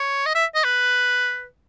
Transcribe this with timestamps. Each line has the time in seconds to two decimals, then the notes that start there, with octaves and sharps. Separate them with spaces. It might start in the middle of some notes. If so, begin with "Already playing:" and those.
Already playing: C#5
0.26 D#5
0.35 E5
0.55 D#5
0.64 B4